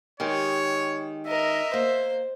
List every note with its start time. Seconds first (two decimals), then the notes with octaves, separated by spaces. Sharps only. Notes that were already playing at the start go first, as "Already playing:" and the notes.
0.20 D#3 G#3 G4 C#5
1.27 A#4 D#5 E5
1.73 A#3 C5